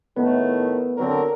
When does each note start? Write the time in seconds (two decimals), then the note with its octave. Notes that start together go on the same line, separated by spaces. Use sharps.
0.16 A2 D#3 A3 B3 B4
0.97 D3 F#3 C4 A#4